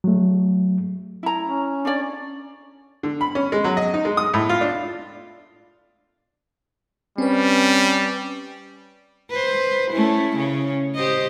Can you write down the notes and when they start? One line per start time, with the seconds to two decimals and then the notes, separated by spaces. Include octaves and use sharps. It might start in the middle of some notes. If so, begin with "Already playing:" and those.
0.04 F#3 A3
1.23 E4 A#5
1.41 C#4
1.85 D4 C#5 D5
3.03 D3
3.21 B5
3.35 C#4
3.52 G#3
3.64 F#3
3.77 D#5
3.94 D#4
4.05 G#3
4.17 D#6
4.34 A2
4.49 F4
4.61 D4
7.18 G3 C4 C#4 B4
9.30 B4 C5
9.92 A3 C#4 E4
10.36 C#3 C#4
10.95 G4 C5 D#5